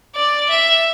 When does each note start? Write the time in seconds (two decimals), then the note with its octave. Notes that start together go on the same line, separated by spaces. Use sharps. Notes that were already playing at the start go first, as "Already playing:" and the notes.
0.15 D5
0.50 E5